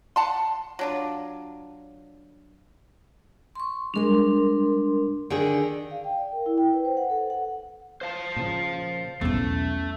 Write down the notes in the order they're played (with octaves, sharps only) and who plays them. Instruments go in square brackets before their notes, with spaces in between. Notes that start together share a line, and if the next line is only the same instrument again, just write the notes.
[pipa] F#5 A5 C6
F#3 D4 F4
[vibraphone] C6 C#6
[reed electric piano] G3 G#3 [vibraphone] D4 A#4 C6
[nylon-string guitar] D3 D#3 G#4 [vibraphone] D5
[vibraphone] F5
G5
D5
A#4
E4
G5
B4
C5
F#5
A4
F#5
[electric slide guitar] C5 F5 A5
[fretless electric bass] A#2 C#3 F3
[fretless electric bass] B1 [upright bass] E2 C#4 [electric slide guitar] A3